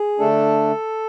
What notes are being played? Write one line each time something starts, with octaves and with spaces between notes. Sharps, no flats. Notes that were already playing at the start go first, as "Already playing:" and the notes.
Already playing: G#4
D3 A3 D4 A4